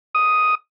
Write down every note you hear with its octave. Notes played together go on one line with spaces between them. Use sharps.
D#6